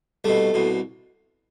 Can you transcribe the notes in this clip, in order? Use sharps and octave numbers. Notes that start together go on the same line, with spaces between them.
C2 B2 A3
C2 B2